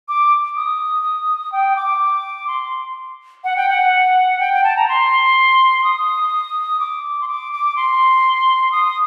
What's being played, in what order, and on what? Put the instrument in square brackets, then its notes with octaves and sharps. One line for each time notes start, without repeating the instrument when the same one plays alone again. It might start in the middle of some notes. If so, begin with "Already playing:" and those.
[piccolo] D6
D#6
G5
D6
C6
F#5
G5
F#5
G5
G5
A5
A#5
C6
D#6
D6
C6
D6
D6
C6
D#6